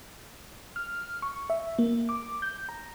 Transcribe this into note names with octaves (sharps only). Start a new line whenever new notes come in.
F6
C#6
E5
A#3
D6
G6
A#5